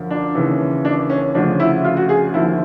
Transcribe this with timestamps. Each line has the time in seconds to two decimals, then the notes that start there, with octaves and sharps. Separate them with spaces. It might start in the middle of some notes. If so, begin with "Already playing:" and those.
Already playing: F#2 D3 F3
0.11 D4
0.35 D#2 C#3 E3
0.85 D4
1.10 C#4
1.35 D2 C#3 F3 D4
1.60 E4
1.85 F4
1.97 F#4
2.09 G#4
2.34 D#2 D3 F3 E4